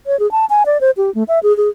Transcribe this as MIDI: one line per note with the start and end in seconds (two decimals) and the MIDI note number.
0.07 0.18 73
0.19 0.30 68
0.32 0.46 81
0.50 0.63 80
0.66 0.80 74
0.81 0.91 72
0.97 1.13 67
1.15 1.24 57
1.28 1.39 76
1.43 1.55 68
1.57 1.69 68